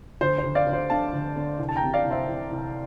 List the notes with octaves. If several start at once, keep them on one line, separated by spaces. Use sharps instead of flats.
D2 C5
C5
D2
D5 F5
D2
C5
D3 F5 A5
D2
D3
C2
A5
G5 A#5
C3
D5 F5
C2
C5 E5
C2
C2